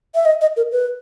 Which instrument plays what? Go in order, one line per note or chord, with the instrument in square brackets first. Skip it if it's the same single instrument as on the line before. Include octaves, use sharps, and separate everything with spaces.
[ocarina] E5
D#5
D#5
A#4
B4